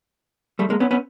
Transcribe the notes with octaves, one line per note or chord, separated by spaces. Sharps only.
G3 A3
G#3 A#3
B3 C#4
B3 C#4